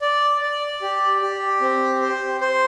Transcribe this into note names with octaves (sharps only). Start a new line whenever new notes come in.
D5
D5
G4
G4
C4
C5
C5